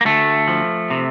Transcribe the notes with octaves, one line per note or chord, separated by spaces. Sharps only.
A#3
D2 A3
F3
C3